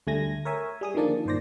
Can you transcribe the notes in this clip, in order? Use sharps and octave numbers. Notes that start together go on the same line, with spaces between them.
D2 G3 A3 G#5 G#6 A#6
A#4 C#5 E5 G#5
G3 G#4 D#6
D3 D#3 F3 A#3 D4 D5
G1 A#2 D#3 C5 D5 A#6